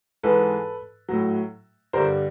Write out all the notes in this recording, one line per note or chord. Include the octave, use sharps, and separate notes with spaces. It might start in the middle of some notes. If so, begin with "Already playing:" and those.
G#2 E3 G#3 A4 B4
A2 F#3
G2 D3 G3 A#4 C5